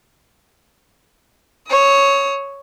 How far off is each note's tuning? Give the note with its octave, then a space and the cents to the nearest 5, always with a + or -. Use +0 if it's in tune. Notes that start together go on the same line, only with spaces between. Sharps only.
C#5 +0 D#6 +35